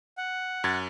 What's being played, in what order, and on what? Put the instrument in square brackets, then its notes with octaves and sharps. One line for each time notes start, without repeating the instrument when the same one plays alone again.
[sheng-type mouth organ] F#5
[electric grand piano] F#2 G#6 A6